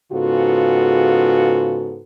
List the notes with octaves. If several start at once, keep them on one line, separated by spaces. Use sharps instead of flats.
G#2 C#3 B3 F4 F#4 A4